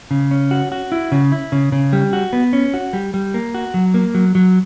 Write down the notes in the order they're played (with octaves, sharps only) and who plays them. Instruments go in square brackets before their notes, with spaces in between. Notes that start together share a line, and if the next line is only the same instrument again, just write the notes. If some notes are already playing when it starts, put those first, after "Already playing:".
[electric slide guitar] C#3
C#4
F#4
F#4
E4
C#3
E4
C#3
C#3
G3
F#4
B3
C#4
F#4
G3
G3
A#3
F#4
F#3
A#3
F#3
F#3